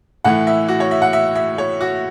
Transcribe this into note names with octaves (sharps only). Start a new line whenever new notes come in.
A2 E3 F#5
E5
F#4
C#5
E5
F#5
E5
E5
C#5
F#4